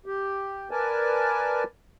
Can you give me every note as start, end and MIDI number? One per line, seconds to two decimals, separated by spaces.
0.06 0.68 67
0.71 1.64 70
0.71 1.64 71
0.71 1.64 74
0.71 1.64 80
0.71 1.64 81